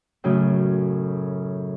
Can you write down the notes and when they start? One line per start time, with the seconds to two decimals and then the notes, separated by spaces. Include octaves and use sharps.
0.24 F#2 A2 C#3